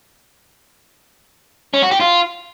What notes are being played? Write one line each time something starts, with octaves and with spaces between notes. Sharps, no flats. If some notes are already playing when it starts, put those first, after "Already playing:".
C#4
F#4
G4
F4